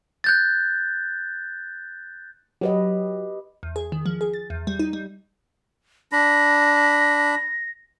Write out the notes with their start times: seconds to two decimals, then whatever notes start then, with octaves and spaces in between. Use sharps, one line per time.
0.24 F#6 G6 A6
2.61 F#3 G4 B4 D#5
3.63 E2
3.76 G#4
3.92 D#3
4.06 F3
4.21 G#4
4.34 A6
4.50 E2
4.67 G3
4.79 D#4
4.93 G3
6.12 D4 B5 A#6